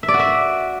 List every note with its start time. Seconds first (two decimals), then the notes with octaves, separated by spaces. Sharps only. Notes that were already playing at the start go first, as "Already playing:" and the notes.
0.03 E5
0.08 D5
0.14 F#4
0.19 E5